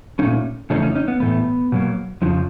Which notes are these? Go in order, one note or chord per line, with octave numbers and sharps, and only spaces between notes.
A#2 F3 A3 C#4 D#4
E2 C#3 F3 A3 C#4 D#4
C#4 D#4
C#4 D#4
B3
A2 E3 A3 B3
B2 F#3 A#3
F2 C#3 F3